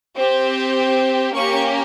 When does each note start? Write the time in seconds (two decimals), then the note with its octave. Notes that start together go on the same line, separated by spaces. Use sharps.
0.18 C4 G4
1.35 A#3 C#4 G4 C#6